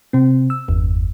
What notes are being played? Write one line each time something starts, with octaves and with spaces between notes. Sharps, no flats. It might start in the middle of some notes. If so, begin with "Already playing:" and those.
C3 C4
E6
G1 E2